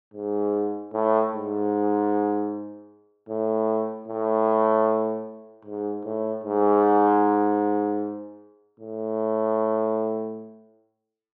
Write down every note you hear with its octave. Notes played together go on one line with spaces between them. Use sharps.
G#2
A2
G#2
A2
A2
G#2
A2
G#2
A2